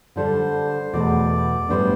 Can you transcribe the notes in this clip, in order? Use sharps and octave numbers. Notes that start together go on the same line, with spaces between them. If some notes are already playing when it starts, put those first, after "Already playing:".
D3 G3 D4 A4 C5
E2 B2 A3 D5
A2 G3 B3 D4 C5